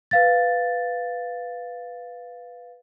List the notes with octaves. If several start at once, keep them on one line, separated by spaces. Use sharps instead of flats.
B4 F5 A6